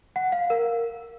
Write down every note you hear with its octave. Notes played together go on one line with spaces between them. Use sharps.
F#5
F5
A#4